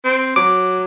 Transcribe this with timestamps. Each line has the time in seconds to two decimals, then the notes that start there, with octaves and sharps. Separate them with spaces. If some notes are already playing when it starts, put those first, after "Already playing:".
0.05 C4
0.36 F#3 D6